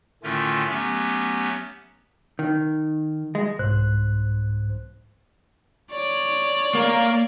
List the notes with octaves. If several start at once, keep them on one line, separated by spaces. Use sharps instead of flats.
A2 D3 D#3 A3 C#4 F4
F#3 A3 B3 C#4 G4
D#3
G#3
C2 G#2 C5 F#6
C#5 D5
A#3 A#4